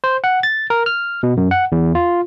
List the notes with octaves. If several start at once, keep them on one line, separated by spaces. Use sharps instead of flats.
C5
F#5
A6
A#4
F6
B2
F#2
F#5
E2
F4